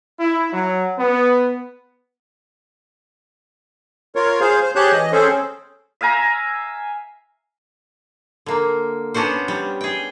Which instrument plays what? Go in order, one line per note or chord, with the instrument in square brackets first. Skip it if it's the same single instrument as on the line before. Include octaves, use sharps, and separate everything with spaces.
[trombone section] E4
F#3
B3
[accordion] F4 A#4 C#5
G#4 C5 F5
C5
G4 G#4 C#5 A5 F#6 G6
E3 D#5
C4 C#4 G#4 A4 C5
[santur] E5 F5 G#5 A#5
[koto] D3 A#3
B3 C#4 D4 F#4 C5
G3
G#4 G5